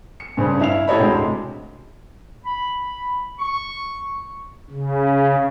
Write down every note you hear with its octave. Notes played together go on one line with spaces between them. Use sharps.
C#7
G2 C#3 C4 C#4
E4 F5 F7
A2 G4 A4 C#5 D#5 B5
D2 C3 G#3
B5
C#6
C#3